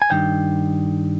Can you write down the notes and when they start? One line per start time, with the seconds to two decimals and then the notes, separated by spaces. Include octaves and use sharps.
0.02 G#5
0.11 G2 D#3 G5